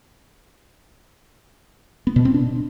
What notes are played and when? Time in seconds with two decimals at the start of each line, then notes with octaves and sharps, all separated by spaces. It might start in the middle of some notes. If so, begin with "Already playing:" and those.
2.07 B3
2.16 B2
2.25 C4
2.34 D4